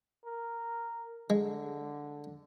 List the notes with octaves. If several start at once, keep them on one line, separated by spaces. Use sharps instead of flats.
A#4
D3 G#3